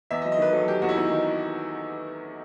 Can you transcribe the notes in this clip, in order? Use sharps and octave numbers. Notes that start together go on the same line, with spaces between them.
E2 E5
D#5
F#3
D#5
D#3 B4
F#3 A4
D#3 G4
E2 F#4
E4
E2 D#4
D#3